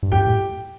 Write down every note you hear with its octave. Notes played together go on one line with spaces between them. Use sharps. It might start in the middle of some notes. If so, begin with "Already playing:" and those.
G2
F2 G4 G5
A2